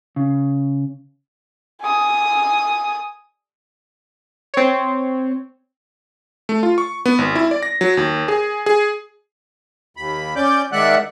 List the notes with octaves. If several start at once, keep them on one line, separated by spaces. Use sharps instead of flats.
C#3
G#5 D#6
C4 C#5
A3
F4
C#6
B3
G#1
E4
D5
A#6
F#3
D#2
G#4
G#4
D#2 B5
C#4 D5 D6 G6
D#3 G#3 D5 E5 F#5 F#6